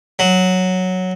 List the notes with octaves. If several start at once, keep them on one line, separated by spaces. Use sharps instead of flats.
F#3